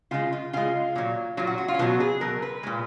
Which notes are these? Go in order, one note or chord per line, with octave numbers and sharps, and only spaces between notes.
C#3 G#3 F4
F4
C#3 G#3 F4
A#2 F#3
A#2 F#3 F4
F#4
F#4
F4
C#4
B2 F#3 B3
G#4
B2 F#3 A#4
B4
A#2 G#3